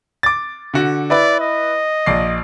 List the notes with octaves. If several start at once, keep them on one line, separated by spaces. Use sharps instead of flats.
D6 A6
D3 F#4
E4 B4 D5
D#5
A#1 D5 C7